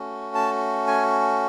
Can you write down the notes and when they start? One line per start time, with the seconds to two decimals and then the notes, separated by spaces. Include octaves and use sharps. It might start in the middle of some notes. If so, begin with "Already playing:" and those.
Already playing: A3 C#4 F#4
0.35 A5
0.87 G#5